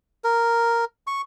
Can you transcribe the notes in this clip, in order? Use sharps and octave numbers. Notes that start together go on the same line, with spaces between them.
A#4
C#6